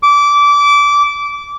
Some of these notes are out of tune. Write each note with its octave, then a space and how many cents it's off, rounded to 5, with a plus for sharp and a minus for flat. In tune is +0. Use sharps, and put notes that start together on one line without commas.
D6 -20